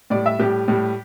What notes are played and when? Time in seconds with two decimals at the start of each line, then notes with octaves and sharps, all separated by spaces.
0.10 A2 G3 D5
0.26 E5
0.39 A2 G3 G4
0.68 A2 G3